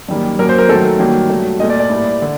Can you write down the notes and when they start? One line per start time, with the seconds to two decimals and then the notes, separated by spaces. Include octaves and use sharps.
0.09 F#2 D#3 G3 A#3
0.39 F#2 F#3 A#3 A#4
0.49 C5
0.58 A#4
0.69 F#2 D#3 F#3 A3 A4
0.99 G2 D#3 F#3 A#3
1.30 G2 F#3 A3
1.59 A#2 D#5
1.64 A3
1.70 D5
1.80 D5
1.89 A2 G3 A#3
2.22 D3